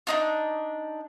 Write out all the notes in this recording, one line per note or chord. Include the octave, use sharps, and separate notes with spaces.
D4 D#4 F4